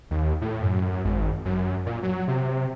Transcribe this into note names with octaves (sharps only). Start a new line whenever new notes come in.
D#2
A2
F#2
G#1
F#2
A#2
F#3
C3